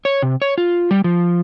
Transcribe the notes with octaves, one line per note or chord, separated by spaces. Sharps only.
C#5
C3
C#5
F4
G3
F3